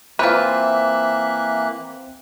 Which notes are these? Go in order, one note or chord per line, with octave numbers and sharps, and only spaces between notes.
E3 A#3 C4 F4 B4 C5 E5 F#6